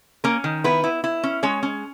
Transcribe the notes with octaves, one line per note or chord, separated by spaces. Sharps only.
A#3 C#4 A#4
D#3
B3 E4 B4
E4
E4
C#4
G#3 C#4 C#5
C#4